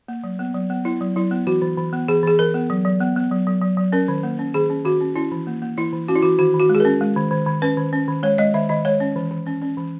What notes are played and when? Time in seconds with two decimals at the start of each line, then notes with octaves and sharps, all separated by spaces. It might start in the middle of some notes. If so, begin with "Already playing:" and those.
0.08 A#3
0.24 F#3
0.39 B3
0.54 F#3
0.70 B3
0.85 B3 E4
1.01 F#3
1.16 F#3 E4
1.31 B3
1.47 E3 F#4
1.62 E3
1.78 E3
1.93 B3
2.08 E3 G#4
2.23 E3 G#4
2.39 E3 A#4
2.54 B3
2.70 F#3
2.85 F#3
3.00 B3
3.16 B3
3.32 F#3
3.47 F#3
3.61 F#3
3.77 F#3
3.92 C#4 A#4
4.08 D#3
4.23 A#3
4.39 C#4
4.54 D#3 G#4
4.70 C#4
4.85 D#3 F#4
5.01 C#4
5.16 C#4 E4
5.31 E3
5.47 A#3
5.62 A#3
5.78 E3 E4
5.93 E3
6.08 C#4 F#4
6.16 E4
6.23 E3 F#4
6.39 D#3 F#4
6.54 D#3
6.60 F#4
6.69 G#3
6.75 G#4
6.80 C#4 A#4
7.01 G#3
7.16 D#3
7.31 D#3
7.46 D#3
7.62 C#4 B4
7.77 D#3
7.93 C#4
8.08 D#3
8.23 G#3 C#5
8.38 G#3 D#5
8.54 D#3 E5
8.69 D#3 D#5
8.85 G#3 C#5
9.00 C#4
9.16 E3
9.31 E3
9.47 C#4
9.62 C#4
9.77 E3